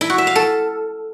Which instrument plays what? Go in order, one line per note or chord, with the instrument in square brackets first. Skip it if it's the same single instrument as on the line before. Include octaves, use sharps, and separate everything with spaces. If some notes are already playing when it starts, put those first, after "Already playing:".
[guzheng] E4
F#4
E5
F5
A4